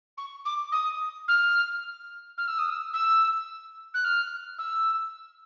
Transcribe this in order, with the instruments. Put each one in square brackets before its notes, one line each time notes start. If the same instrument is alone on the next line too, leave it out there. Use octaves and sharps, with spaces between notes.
[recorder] C#6
D6
D#6
F6
F6
E6
D#6
E6
E6
F#6
F6
E6